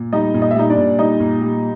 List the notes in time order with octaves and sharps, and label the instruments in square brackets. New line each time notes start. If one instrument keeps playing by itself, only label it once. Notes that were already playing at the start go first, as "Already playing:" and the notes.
Already playing: [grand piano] A#2
[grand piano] G3 [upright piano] D#4 D#5
[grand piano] A#2
[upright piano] D#5
E5
[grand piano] G3 [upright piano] D#4 D#5
[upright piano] D4 D5
[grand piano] A#2
[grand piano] G3 [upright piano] D#4 D#5
[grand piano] A#2
G3